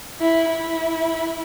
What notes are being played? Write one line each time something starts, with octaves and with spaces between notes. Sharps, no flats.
E4
E4